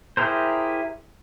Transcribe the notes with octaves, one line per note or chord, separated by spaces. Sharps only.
E4 G4 G#4 A#4 C5